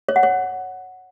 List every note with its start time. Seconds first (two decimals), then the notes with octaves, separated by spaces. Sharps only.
0.09 C#5
0.16 F#5
0.23 C#5